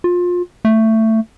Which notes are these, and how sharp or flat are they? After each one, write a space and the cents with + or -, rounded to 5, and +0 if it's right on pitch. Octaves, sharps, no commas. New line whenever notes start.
F4 +25
A3 +15